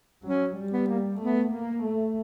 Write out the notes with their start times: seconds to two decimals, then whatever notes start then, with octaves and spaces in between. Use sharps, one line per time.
0.24 F#3 C#4
0.56 G3
0.72 B3
0.88 A#3
1.21 A3 B3
1.53 A#3
1.84 A3